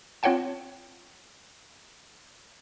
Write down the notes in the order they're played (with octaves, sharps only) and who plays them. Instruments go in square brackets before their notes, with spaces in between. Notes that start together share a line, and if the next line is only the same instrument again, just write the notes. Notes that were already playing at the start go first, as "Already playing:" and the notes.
[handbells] C4 F4 C#5 F#5 G5 A5